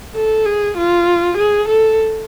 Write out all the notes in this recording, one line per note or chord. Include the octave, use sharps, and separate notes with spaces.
A4
G#4
F4
G#4
A4